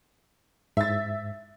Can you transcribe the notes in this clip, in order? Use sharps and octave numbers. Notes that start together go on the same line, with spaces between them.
G#2 E5 A6